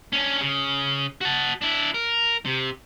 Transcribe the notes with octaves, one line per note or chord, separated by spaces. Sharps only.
C#4 D4
C#3
F#4 A5
D4 E4
A#4
C3